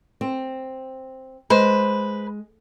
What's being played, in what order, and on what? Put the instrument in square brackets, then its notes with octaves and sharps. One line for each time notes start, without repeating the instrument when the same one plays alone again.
[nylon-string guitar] C4
[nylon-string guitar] G#3 [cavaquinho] B4 C5